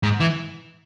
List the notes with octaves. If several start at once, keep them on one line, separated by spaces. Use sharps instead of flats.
G#2
E3